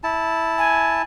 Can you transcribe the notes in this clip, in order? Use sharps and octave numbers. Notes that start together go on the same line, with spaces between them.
E4 A5
G#5